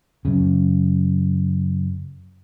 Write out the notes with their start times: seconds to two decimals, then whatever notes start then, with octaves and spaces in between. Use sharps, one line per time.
0.25 F#2 C#3